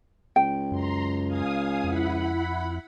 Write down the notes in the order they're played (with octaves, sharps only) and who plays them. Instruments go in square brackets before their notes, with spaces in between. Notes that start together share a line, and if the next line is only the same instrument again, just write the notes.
[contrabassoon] C#2 [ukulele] G5
[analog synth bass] F#2 [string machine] A#5 C6
[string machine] F5 G#5 D#6
[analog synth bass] F2 [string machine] E4 F#5 B5